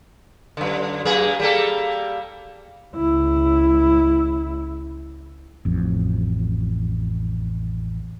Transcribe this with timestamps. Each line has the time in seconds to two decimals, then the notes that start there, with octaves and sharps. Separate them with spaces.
0.57 F#2 D3
1.05 F#2 A#3 G#4
1.40 G3 A#3 A4
2.95 C#2 E4
5.65 A1 F2